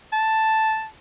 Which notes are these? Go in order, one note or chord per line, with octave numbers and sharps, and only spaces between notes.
A5